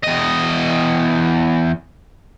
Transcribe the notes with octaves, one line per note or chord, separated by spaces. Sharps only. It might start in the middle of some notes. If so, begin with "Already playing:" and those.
E2 D#5